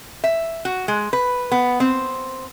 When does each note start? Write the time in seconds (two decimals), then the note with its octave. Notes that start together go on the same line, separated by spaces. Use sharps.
0.24 E5
0.65 F#4
0.88 G#3
1.13 B4
1.52 B3
1.80 C4